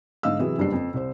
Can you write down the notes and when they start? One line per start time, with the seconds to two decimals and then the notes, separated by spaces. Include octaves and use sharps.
0.23 G#2 D3 D#5 F5 E6
0.39 C3 E3 F#3 G#4
0.58 F#1 G2 G3 D4 C7
0.73 F2
0.94 C2 C5